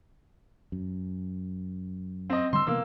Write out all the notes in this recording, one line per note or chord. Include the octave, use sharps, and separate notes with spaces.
F#2
C4 D#5
D3 G3 C6 E6
C3 E3 A#3 B3 E6